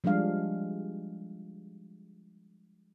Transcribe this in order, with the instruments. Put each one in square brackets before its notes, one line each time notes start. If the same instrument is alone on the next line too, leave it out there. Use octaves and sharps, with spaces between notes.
[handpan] F3 G3 G#3 D4 F5